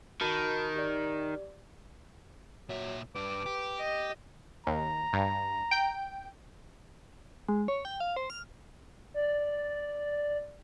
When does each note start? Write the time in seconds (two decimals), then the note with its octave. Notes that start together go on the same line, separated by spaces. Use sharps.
0.21 D#3 F#4 A5 B5
0.75 G4 D5
2.69 A#2 F#3 E5
3.15 G2 D4 B4 D6
3.46 G4
3.80 D#5
4.67 D#2 A#5
5.13 G2
5.71 G5 G6
7.49 G#3
7.68 C#5
7.85 G5
8.00 F5
8.16 C5
8.30 F6
9.14 D5